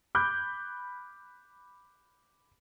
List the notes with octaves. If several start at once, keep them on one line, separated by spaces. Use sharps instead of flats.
B5 D6 F#6 G6